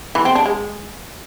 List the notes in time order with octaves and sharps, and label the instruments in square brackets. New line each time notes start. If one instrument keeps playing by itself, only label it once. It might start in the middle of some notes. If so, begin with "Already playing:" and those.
[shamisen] E3
C4
D4
G#3